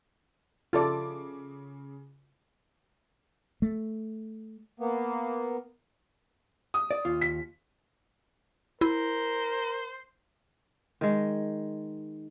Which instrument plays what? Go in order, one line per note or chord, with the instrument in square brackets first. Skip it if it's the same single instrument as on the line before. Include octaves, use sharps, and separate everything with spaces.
[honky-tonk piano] C#3 D6 [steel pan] F4 A4 D5
[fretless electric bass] A3
[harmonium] A#3 B3
[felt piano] D#6
[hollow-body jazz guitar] D5
D#2 F4
[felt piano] B6
[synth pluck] E4 [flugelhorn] A#4 [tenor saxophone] C5
[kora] D#3 G#3